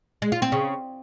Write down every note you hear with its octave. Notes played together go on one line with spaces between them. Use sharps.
G#3
F4
C4
C#3